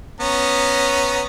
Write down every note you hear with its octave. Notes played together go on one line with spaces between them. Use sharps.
B3 C#4 A#5